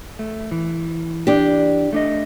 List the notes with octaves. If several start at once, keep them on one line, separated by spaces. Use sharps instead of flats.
A3
E3
D4 G4
A3 D4 D#5